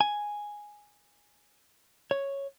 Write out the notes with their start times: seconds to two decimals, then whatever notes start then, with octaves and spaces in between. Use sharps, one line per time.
0.01 G#5
2.11 C#5